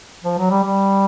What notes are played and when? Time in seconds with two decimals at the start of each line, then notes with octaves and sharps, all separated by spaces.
0.24 F3
0.38 F#3
0.50 G3
0.64 G3